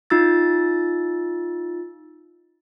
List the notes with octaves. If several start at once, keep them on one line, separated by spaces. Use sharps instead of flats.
D#4 F4 E6 A6